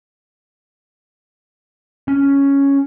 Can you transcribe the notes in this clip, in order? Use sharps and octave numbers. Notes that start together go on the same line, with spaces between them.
C#4